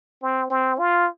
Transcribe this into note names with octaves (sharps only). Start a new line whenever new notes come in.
C4
C4
F4